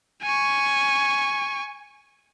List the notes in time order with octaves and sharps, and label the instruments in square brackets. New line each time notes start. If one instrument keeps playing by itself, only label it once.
[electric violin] G#5 C#6